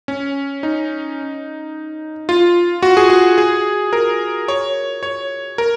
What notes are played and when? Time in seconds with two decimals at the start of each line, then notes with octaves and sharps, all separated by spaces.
0.08 C#4
0.63 D#4
2.29 F4
2.83 F#4
2.97 G#4
3.10 F#4
3.38 G#4
3.93 A#4
4.48 C#5
5.03 C#5
5.58 A#4